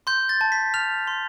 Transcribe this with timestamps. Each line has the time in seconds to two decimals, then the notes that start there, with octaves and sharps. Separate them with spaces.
0.07 C6 G6
0.29 A6
0.41 A5
0.52 B6
0.74 F6 F7
1.07 C6